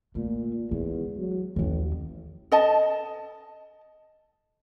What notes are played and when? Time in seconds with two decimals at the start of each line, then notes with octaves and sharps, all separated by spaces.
0.15 A#2 A3
0.71 E2 G#3
1.18 F#3
1.56 A1 D#2 E3
2.52 A4 D#5 A5